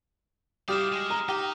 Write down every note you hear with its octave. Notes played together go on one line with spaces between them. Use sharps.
G3 E4 G4 F5 D#6 F6 E7
G#3
A#5
D#4 G4